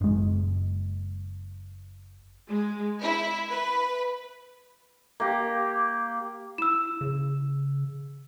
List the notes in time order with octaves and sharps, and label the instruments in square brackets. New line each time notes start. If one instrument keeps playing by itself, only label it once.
[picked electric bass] F#1 G#3
[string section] G#3
E4
B4
[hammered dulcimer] A#3 G4
[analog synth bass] E4 [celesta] E6 E7
[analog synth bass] C#3